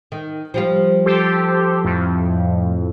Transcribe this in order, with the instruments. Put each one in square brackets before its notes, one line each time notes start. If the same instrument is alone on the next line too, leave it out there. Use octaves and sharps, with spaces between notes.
[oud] D#3
F3 G3 F4
[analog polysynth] G4 A4 C5
F2 A2